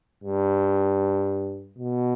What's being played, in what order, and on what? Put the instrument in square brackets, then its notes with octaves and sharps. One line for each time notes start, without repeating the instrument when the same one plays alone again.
[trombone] G2
B2